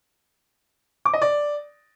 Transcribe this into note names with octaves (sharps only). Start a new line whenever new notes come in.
D6
D#5
D5